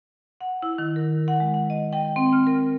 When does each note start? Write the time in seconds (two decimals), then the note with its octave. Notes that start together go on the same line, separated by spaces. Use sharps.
0.41 F#5
0.62 E4
0.78 D#3
0.96 A#4
1.28 F#5
1.40 G#3
1.54 F#5
1.70 D#5
1.93 G5
2.16 C4
2.32 F6
2.47 A#4